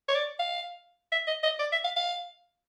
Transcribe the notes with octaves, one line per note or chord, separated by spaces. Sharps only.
C#5
D5
F5
E5
D#5
D#5
D5
E5
F5
F5